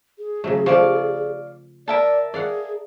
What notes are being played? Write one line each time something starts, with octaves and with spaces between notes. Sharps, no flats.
G#4
C#3 F#3 A3
F3 A3 D5 F5 C#6
A#4 D5 E5 A5
G#4 D5 F5 F#5